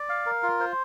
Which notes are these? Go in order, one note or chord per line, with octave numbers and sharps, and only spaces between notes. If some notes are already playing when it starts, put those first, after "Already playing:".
Already playing: D5
F5
A#4
F4
C5